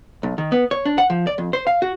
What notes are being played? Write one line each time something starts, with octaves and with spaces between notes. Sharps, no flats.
B1
D#3
B3
C#5
D4
F#5
F3
D5
F2
C5
F5
F#4